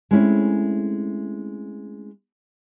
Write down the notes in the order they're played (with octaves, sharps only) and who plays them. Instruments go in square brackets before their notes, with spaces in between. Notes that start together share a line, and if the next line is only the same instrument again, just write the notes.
[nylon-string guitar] G#3 A3 C4 C#4 E4